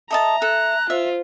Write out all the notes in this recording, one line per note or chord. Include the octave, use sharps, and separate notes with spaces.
A4 D#5 E5 A5 A#5
A4 F#6
F4 C5 E5